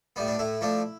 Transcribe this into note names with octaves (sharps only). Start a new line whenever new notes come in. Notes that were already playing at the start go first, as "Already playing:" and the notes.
A2 G3 B3
D4
A2 E4
F3 A3 D4